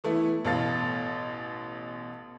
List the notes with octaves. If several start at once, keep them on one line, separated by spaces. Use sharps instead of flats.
E3 A3 B3 E4
A1 B2 A4 F5 A6